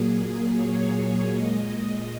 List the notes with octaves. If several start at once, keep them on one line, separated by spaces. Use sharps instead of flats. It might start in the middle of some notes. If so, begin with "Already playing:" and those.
Already playing: A#2 F#3 A#3 G#4
C#5
A#2 G#3 D#5
D#5